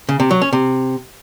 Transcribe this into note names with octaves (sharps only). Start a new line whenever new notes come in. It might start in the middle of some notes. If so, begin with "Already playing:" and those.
C#3
C3
F#3
C#4
C3